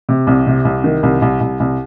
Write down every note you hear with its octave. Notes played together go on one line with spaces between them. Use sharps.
C3
C2
C3
C2
D#3
C2
C2
C2
C2